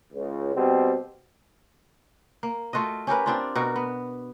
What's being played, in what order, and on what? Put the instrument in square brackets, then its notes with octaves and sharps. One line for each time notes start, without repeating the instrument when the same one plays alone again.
[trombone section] C#2
B2 G3 C4
[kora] A#3
A3 F4 F#4 D#5
C#4 G4 A#4 B4
C4 D4 F4
B2 F#4 A#4
B3